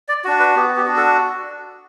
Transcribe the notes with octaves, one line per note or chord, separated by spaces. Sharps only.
D5
D4 F#4
B4
B3 G4
G4
D4 F#4
A4